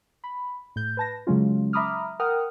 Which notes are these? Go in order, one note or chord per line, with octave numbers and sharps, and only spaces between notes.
B5
A2 G6
B4 A5 A#6
C#3 F#3 G#3 C#4 F4
E5 A#5 B5 D6 D#6 F6
A#4 F#5 G5 D#6 F6